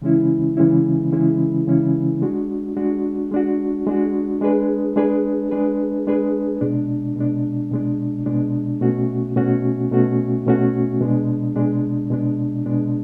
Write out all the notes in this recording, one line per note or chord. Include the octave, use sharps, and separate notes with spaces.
C#3 E3 G#3 C#4 E4
C#3 E3 G#3 C#4 E4
C#3 E3 G#3 C#4 E4
C#3 E3 G#3 C#4 E4
G#3 D4 F#4
G#3 D4 F#4
G#3 D4 F#4
G#3 D4 F#4
G#3 D4 G#4 B4
G#3 D4 G#4 B4
G#3 D4 G#4 B4
G#3 D4 G#4 B4
B2 G#3 D4
B2 G#3 D4
B2 G#3 D4
B2 G#3 D4
B2 A3 C#4 F#4
B2 A3 C#4 F#4
B2 A3 C#4 F#4
B2 A3 C#4 F#4
B2 G#3 D4
B2 G#3 D4
B2 G#3 D4
B2 G#3 D4